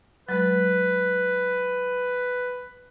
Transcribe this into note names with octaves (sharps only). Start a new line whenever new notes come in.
F#3 G#3 B4